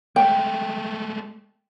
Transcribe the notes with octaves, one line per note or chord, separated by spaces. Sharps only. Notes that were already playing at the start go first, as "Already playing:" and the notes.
G#3 A3 G5